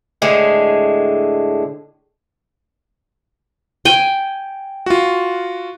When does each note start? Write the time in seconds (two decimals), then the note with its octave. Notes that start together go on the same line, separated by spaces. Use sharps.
0.22 A2 D3 G#3
3.85 G5 G#5
4.86 F4 F#4